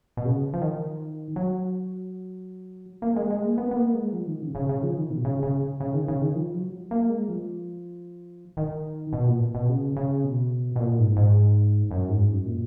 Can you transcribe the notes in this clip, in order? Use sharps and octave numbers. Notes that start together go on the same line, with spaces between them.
B2
C#3
F3
D#3
F#3
A#3
G#3
G#3
A#3
B3
B3
A#3
G#3
F3
D#3
C#3
C#3
C#3
F3
D#3
B2
C#3
C#3
C#3
D#3
C#3
D#3
F3
F#3
A#3
G#3
F3
D#3
B2
A#2
B2
C#3
C#3
B2
B2
A#2
G#2
G#2
F#2
G#2
F#2
A#2